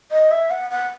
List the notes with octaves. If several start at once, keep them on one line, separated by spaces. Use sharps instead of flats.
D#5
E5
F#5
F#5